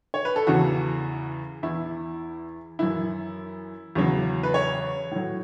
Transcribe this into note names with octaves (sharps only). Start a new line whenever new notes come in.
C#5
B4
A4
E2 C#3 E3 F#4
E2 E3 E4
F#2 E3 E4
E2 C#3 F#3
B4
C#5
A2 F#3